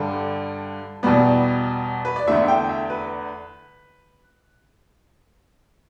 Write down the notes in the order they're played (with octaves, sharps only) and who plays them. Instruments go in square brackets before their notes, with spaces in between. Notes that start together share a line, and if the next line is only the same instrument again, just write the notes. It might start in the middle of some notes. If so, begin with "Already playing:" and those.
Already playing: [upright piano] G2 D3 G3 A4
E2 B2 G3 B3 D5
B4
D5
E2 D3 A3 E5
E5
G5
E5
B4